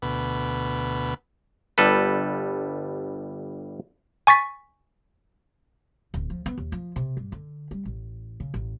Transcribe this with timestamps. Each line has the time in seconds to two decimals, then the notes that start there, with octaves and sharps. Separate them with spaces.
0.02 D2 B2 B4
1.78 G1 G3 A4 B4
4.27 G#5 C#6 A6 B6
6.14 D1
6.30 F3
6.46 B3
6.58 D#2
6.72 F3
6.96 C3
7.17 G2
7.32 D3
7.71 G3
7.85 A1
8.40 C#3
8.54 A1